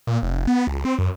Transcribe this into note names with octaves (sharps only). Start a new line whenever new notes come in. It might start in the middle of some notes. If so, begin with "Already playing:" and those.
A#2
F1
B3
C#2
C4
F#2